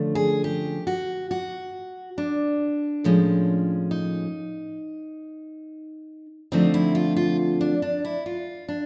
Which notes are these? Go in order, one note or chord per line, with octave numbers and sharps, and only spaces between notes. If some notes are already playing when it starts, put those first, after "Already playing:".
Already playing: D3 F3 A3 C#4
G#4
G4
F#4
F#4
D4
A2 F3 G#3 C#4
D#4
D3 F3 A3 C4 D#4
E4
F4
F4
D4
D4
E4
F4
D4